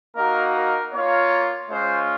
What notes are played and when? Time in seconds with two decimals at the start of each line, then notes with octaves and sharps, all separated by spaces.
0.16 A#3 D#4 F#4 A#4
0.55 A#4
0.93 A#3 F4 C#5
1.70 G#3 C#4 F4 C5